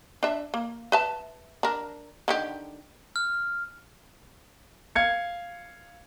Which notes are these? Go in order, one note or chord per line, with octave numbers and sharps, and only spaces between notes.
D4 E5
A#3
B4 E5 A5
D4 A#4
D3 D#3 G4
F6
F5 G#6 C#7